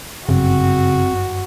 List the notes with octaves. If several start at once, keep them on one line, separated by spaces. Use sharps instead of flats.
G1 F#2 C#3 C4 F#4